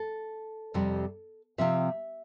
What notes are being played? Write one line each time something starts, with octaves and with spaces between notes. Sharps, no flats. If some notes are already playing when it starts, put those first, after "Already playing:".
Already playing: A4
F2 C3 G3 C4
C3 F3 C4 E5